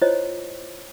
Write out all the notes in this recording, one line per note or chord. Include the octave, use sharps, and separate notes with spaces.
E4 F4 C5 C#5 D#5